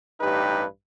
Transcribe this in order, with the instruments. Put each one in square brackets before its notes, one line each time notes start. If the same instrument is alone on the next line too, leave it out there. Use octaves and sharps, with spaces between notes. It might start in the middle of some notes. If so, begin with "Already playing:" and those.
[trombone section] A1 G2 D#4 G4 B4